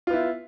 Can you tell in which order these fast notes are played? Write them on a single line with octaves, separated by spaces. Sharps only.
F4 B3 E4